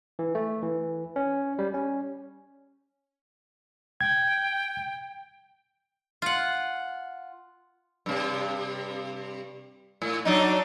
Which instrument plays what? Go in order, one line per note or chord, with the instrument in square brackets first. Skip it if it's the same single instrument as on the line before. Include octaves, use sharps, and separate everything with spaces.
[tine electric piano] E3
A3
E3
C#4
G3
C#4
[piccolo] G5 [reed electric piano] G#6
[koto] F4 F#5
[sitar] G2 C3
A2
F#3 D4 D#4